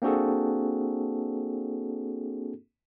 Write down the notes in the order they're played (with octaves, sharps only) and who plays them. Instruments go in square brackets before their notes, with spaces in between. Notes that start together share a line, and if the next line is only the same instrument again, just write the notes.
[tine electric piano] A#3 C4 D4 F#4 G#4 A4